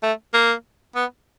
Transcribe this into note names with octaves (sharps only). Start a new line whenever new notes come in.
A3
A#3
B3